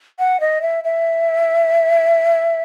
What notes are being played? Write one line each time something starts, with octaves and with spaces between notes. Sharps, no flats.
F#5
D#5
E5
E5